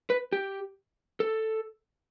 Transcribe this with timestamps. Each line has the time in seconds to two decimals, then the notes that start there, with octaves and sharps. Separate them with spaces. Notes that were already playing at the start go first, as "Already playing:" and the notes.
0.10 B4
0.32 G4
1.20 A4